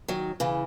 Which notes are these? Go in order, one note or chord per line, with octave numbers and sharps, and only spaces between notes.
D#3 F#3
C#3 E3